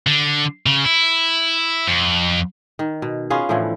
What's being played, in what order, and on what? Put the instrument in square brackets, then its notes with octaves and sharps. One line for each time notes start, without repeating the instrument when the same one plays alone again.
[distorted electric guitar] D3
C#3
E4
F2
[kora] D#3
B2
B3 C#4 F4 G#4
A2 D3 E3 F3